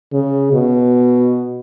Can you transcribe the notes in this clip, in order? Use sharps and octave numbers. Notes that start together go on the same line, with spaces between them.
C#3
B2